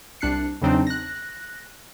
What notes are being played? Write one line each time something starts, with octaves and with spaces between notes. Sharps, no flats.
C2 D4 F#6 C7 C#7
E2 C#3 F#3 C4 D4 D#4
F#6 A#6